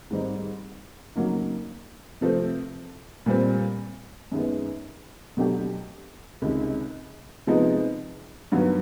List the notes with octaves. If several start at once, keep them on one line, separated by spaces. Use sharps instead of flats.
G#2 D#3 G3 C4 D#4
F2 C#3 F#3 A#3 D#4
C3 F3 A3 C4
A#2 G3 C4
F#2 D#3 G#3 B3
B2 F#3 A3 D4 G4
C#2 C3 D#3 G#3
C3 F3 G#3 B3 D#4
G2 D#3 F#3 B3